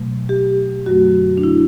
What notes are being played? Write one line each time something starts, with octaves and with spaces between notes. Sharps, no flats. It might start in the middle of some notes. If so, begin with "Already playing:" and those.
Already playing: B2 F#3 A3
G4
F#2 D3 F#3 A3 F#4
D4
E4